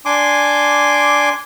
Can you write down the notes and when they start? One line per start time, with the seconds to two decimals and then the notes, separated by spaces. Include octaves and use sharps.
0.05 D4 G#5 C6 D6